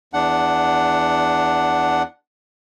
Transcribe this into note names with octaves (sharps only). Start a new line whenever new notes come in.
E2 D4 F#5